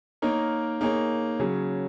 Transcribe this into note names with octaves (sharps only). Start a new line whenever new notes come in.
A#3 D#4 A#4 C#5
A#3 D#4 G#4 C#5
C#3 F#3 C#4 G#4